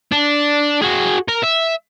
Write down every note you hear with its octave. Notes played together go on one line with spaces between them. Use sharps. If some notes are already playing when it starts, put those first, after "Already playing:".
D4
F#4 G#4
A#4
E5